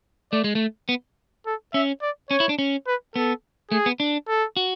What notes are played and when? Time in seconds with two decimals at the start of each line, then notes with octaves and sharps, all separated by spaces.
0.32 A3 D5
0.44 G#3
0.55 A3
0.89 B3
1.46 A4
1.74 C#4 E5
2.02 D5
2.30 C#4 C#5
2.40 E4
2.49 D4
2.59 C#4
2.87 B4
3.16 B3 A4
3.71 A3 G#4
3.86 B3
4.00 D4
4.28 A4
4.57 F#4